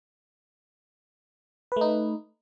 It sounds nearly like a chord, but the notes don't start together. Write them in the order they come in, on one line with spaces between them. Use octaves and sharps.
B4 A3 D#4